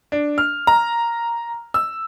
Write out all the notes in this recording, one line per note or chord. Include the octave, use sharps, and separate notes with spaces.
D4
F6
A#5
E6